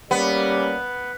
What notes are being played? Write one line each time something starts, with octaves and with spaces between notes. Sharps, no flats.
G3 A#3 B3 C#4